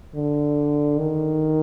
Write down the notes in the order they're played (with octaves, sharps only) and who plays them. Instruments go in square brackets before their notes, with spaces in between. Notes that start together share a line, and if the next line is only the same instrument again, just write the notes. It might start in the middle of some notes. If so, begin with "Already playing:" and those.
[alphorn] D3
D#3